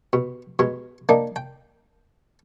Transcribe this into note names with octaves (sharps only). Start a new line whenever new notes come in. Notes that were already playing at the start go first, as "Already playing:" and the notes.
B2
B2 G#3
A#3 D4 D#4
G5